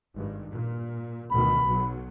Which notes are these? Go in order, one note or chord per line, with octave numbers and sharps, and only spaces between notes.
G#1 G2
A#2
D2 B2 D#3 B5
B1 F#3